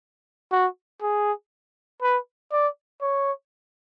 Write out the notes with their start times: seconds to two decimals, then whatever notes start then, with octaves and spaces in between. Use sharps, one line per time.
0.52 F#4
1.02 G#4
2.02 B4
2.52 D5
3.02 C#5